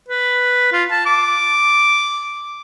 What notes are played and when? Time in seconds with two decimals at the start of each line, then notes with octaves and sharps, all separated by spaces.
0.08 B4
0.72 F4
0.91 A5
1.06 D6